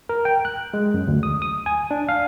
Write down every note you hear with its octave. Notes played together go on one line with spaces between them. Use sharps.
A#4
G5
F#6
G#3
F#2
D2
D#6
D#6
G#5
D4
F5